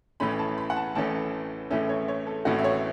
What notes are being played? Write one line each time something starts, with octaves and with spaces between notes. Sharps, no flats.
A1 A2 E3 A3 C#4 B5
A5
B5
F#5
A5
A1 A2 E3 A3 C#4 A5
A1 A2 E3 A3 C#4 E5
C#5
C#5
A4
A1 A2 E3 A3 C#4 F#4
E5
C#5